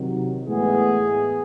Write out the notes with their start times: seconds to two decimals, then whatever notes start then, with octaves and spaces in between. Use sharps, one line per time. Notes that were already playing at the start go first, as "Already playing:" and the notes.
Already playing: C3 D#3 F#3
0.45 A2 E3 G#3 B3 G#4